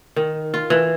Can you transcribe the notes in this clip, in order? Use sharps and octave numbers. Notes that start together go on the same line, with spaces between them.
D#3
F4
E3